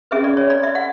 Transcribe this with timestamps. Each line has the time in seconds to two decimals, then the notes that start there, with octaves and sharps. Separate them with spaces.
0.11 C#4 G#4 B4 E5
0.24 D5
0.37 C#5
0.50 D5
0.63 E5
0.75 F#5